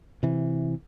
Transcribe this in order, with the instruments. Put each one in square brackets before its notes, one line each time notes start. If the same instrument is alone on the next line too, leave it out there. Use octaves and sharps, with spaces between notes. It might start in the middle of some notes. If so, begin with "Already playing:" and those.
[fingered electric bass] C3 E3